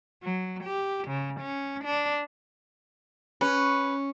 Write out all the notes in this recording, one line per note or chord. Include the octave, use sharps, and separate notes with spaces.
F#3
G4
C#3
C#4
D4
C#4 B4